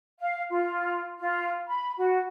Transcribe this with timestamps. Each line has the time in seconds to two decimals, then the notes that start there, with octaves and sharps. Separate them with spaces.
0.20 F5
0.50 F4
1.19 F4
1.68 B5
1.98 F#4